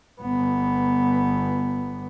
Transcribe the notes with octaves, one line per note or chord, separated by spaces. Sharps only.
G1 B3